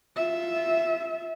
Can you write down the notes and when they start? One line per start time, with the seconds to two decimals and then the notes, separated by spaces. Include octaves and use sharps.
0.16 F4 E5